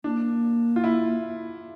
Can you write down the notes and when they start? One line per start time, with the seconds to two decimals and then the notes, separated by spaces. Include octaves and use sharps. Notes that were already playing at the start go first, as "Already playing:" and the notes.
0.04 A#3 D4
0.76 F4
0.84 E4